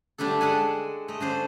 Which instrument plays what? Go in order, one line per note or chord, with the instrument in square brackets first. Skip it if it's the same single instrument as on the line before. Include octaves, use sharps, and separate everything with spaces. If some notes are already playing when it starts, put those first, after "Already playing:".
[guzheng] D3 G3 A3 D4 A4
G#3 A4 F#5 G#5
A3 D#5
D3 C#4 C5 D5